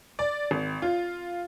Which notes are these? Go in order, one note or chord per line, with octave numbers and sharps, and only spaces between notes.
D5
G#1
F4